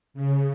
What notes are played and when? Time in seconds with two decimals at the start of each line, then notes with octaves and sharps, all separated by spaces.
0.14 C#3